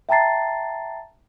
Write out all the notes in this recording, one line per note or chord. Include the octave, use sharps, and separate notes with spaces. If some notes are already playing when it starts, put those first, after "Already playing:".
E5 G5 A5 A#5 A6 C7